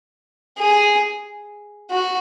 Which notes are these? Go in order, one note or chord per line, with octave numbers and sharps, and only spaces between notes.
G#4
F#4